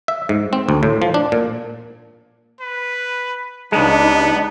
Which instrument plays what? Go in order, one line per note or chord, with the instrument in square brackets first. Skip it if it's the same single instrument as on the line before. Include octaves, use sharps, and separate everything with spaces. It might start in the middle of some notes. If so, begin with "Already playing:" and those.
[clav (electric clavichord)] E5
G#2
C4
D2
A2
F3
D4
A#2
[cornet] B4
[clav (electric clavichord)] C#2 G#3 [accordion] G3 D4 D#4 [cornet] B3